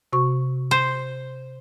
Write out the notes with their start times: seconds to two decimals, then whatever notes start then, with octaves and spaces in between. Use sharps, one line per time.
0.13 C3 F#4 C#6
0.71 C5